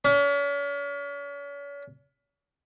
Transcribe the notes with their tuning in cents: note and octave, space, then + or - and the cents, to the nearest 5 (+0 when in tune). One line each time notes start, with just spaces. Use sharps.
C#4 +40